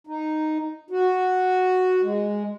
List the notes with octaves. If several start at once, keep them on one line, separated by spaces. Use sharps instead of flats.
D#4
F#4
G#3